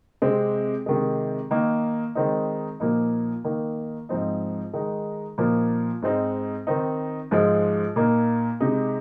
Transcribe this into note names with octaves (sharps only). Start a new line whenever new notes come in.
C3 G#3 C4
C3 D#3 G#3
D#3 A#3 D#4
D#3 G#3 C4 D#4
A#2 F3 A#3 D#4
D#3 A#3 D#4
G#2 F3 C4 D#4
D#3 G#3 D#4
A#2 F3 A#3 D#4
G#2 G#3 C4 D#4
D#3 C4 D#4
G#2 F3 G#3
A#2 A#3 D#4
C3 G#3 D#4